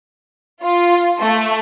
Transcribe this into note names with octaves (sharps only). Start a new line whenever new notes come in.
F4
A3